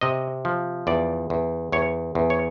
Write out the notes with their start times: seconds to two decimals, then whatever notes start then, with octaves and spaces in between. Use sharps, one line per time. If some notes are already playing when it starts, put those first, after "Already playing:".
0.01 C3 D#5
0.45 F3
0.87 E2 D5
1.30 E2
1.72 E2 C#5
2.15 E2
2.30 C#5